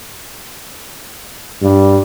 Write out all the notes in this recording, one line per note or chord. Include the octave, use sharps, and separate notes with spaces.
G2